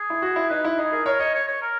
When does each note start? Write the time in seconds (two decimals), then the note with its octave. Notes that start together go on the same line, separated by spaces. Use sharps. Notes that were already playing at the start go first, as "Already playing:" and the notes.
Already playing: G#4
0.10 E4
0.22 F#4
0.36 E4
0.50 D#4 B4
0.65 E4
0.78 D#4 G#4
0.92 G#4 A#4
1.06 A#4 C#5
1.19 C#5 D#5
1.34 C#5
1.48 C#5
1.62 A#4